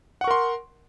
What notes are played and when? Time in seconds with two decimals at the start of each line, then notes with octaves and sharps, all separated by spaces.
0.21 F#5
0.24 C#6
0.27 A#4
0.31 C6